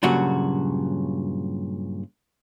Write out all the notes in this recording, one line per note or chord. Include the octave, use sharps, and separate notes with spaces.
G2 A#2 C#3 F#3 F#4